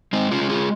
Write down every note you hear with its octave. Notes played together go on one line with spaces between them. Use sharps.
G#3 C4 D#4
C#4 F4
G#3
F4 G#4